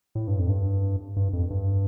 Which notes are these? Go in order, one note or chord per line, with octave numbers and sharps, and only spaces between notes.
A2
G2
F2
G2
G2
F2
G2